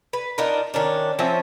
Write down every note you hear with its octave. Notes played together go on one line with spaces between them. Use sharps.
B4
D4 D#4 F4 A#4
D#3 C#4 D4
F3 C4 C#4 E5